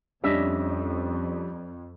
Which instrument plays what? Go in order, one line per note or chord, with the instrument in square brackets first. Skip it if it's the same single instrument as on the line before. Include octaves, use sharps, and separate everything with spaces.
[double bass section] F2 [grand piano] G3 [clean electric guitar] C#4 D#5 E5 [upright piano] D4